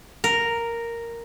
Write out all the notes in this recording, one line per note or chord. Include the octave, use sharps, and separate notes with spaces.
A#4